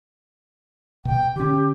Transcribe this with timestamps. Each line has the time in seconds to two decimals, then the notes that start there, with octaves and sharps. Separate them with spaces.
1.05 B2 G5
1.36 D3 C#4 G4